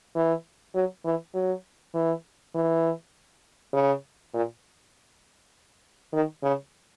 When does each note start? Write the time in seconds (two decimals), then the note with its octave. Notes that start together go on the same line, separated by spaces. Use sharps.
0.15 E3
0.75 F#3
1.05 E3
1.34 F#3
1.94 E3
2.54 E3
3.73 C#3
4.34 A#2
6.13 D#3
6.43 C#3